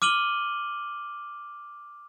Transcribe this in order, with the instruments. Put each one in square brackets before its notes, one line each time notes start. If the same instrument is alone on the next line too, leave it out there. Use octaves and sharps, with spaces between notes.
[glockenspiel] D6 F6 D#7 F#7 G7